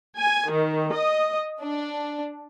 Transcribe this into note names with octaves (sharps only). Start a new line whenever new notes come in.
G#5
D#3
D#5
D4